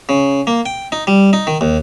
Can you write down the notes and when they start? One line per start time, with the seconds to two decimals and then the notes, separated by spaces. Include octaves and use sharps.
0.09 C#3
0.47 A#3
0.66 G5
0.92 D#4
1.07 G3
1.33 D#4
1.47 D#3
1.61 D#2